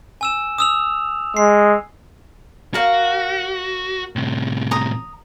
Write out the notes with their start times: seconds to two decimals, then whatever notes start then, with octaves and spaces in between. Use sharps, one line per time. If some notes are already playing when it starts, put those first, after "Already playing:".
0.21 G#5 E6 E7
0.58 D#6 E6 F7
1.37 G#3 C7
2.74 F#4 A#4 F5
4.16 A2 C3
4.71 A#5 D#6